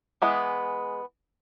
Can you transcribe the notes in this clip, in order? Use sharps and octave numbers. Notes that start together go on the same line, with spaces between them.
E3 G#3 B3